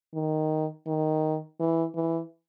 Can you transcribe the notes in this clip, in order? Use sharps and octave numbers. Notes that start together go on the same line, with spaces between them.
D#3
D#3
E3
E3